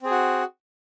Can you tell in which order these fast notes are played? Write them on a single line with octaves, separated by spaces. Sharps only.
C4 G#4 F#4